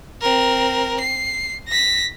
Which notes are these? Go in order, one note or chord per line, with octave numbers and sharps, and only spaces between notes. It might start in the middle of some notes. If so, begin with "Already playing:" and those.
C4 A#4
C7
A#6 B6